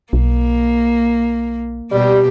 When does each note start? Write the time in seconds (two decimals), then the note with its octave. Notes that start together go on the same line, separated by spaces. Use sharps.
0.13 B1 A#3
1.91 B2 G3 G4